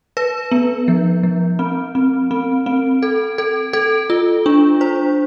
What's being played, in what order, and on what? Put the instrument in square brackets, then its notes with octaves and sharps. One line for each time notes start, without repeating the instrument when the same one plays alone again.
[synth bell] B4
B3
F3
F3
C4
C4
C4
C4
A4
A4
A4
F4
D4
C5